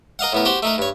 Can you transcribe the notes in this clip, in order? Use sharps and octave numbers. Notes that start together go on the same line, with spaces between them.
A#4 D#5 F5 F#5
A2 B3 A#4
F#4 G4 C5
A3 D#4 A#4
G2 C#5